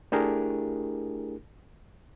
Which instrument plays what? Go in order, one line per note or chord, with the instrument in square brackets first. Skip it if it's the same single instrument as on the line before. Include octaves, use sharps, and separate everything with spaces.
[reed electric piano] A3 D4 E4 G4 G#4 A#4